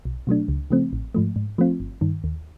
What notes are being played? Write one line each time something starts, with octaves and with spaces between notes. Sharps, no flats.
B1
B2 F#3 A3 D4
C#2
C#3 F3 A3 C4
A1
G#2 F3 A3
G#2
F3 A3 C4 F4
G1
G2 D#3
D#2